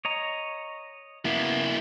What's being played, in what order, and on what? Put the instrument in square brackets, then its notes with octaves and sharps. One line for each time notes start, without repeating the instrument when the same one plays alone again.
[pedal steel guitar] C#5 D#5 A#5
[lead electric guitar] A#3 E4 [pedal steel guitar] B3